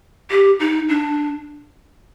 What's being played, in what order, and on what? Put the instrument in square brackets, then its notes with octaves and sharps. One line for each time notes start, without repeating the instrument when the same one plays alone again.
[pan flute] G4
D#4
D4